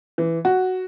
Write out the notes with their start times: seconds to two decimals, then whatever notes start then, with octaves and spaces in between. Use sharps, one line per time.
0.18 E3
0.45 F#4